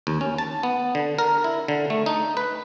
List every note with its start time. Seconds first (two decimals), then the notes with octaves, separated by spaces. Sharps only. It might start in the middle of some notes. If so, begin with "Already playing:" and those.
0.07 D#2
0.21 C#4
0.38 A5
0.63 B3
0.95 D3
1.19 A#4
1.44 E4
1.68 D3
1.90 A3
2.06 D#4
2.37 B4